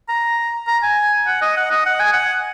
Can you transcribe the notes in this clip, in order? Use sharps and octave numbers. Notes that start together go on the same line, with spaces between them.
A#5
A#5
G#5
F#5
D#5
F#5
D#5
F#5
G#5
F#5